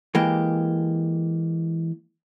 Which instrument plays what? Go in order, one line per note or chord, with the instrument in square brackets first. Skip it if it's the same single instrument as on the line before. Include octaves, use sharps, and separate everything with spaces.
[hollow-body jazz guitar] E3 G#3 A#3 G4